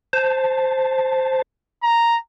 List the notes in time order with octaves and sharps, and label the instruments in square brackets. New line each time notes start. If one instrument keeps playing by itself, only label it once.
[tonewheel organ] C5 A5
[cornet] A#5